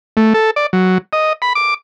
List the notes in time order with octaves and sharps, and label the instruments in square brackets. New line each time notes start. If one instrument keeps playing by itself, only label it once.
[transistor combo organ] A3
A4
D5
F#3
D#5
B5
D6